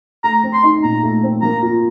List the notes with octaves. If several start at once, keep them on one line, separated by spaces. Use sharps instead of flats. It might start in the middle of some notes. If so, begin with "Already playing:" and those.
A3 A#5
C4
C6
D#4
A#2 A#5
A3
C4
A#3 A#5
F4